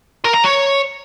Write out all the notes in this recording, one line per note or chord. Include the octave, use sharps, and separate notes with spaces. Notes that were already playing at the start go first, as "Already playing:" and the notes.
A#4
A#5
C#5